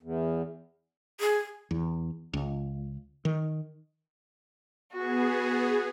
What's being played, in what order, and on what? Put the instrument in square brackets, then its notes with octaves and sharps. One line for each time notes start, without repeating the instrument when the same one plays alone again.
[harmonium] E2
[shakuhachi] G#4
[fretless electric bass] E2
C#2
D#3
[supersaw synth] B3 G#4 [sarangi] F#4